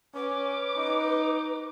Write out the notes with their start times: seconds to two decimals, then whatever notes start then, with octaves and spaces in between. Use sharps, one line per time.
0.15 C#4 B4 D6
0.77 D#4